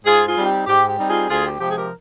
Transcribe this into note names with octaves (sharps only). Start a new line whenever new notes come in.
G#2 F4 G#4
F4 G#4
G3 C4 D#4
G4
G#2 G4
G4
G3 C4 D#4
F4 G#4
D2 F4 G#4
G4
C3 F3 G#3 G4
G#4
G4 A#4